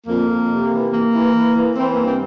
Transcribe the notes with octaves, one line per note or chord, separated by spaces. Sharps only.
F2 A#3
F2
C3
E3
E3 A#3
E3
E3
E3
E3 C4
A#3
G2
C4